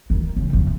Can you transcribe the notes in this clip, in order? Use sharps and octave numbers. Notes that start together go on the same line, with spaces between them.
D#3
C#3
F2